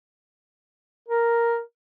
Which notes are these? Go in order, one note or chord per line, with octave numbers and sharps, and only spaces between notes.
A#4